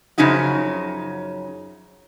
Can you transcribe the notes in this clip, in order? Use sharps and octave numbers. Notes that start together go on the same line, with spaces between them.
F#2 C#3 F3 C#4 D#4 F#4